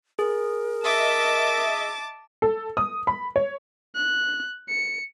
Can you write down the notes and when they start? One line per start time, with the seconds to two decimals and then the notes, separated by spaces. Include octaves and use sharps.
0.19 G#4 A#4
0.84 D#5 E5 A5 D6 A6
2.42 A4
2.77 D#6
3.07 B5
3.36 C#5
3.96 F#6
4.69 C#7